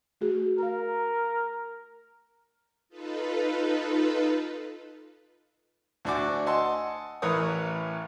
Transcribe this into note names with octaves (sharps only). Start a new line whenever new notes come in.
A3 F#4 G#4
A#4 F5 A#5
D#4 F4 A4 B4
D2 D4 F#4 G#5 D6
D#5 F#5 G#5 A5 C6 E6
A1 E3 A#4 B4 C#5 D#6